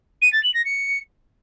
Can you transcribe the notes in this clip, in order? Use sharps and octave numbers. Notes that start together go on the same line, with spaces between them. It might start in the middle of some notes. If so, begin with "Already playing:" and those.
D#7
A6
F#7
A#6
C#7